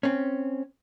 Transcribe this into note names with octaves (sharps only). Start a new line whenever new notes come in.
C4 C#4